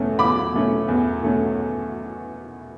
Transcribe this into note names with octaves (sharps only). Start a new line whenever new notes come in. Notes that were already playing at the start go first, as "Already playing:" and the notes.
Already playing: E2 B2 A3 C#4
E2 B5 D6
B2 A3 C#4
E2
B2 A3 C#4